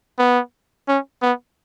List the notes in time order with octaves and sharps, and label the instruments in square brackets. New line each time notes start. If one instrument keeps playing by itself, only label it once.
[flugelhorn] B3
C#4
B3